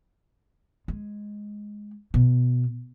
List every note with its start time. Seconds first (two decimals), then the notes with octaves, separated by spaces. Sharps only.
0.88 G#3
2.14 B2